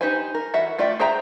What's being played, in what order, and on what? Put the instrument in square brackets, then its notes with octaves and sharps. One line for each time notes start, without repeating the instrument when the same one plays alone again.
[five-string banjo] D#4 G4 B4 C5 G#5
A#4
E3 F#4 A4 E5 F#5
A3 F4 D5 E5 G5
G#4 C5 E5 G5 A#5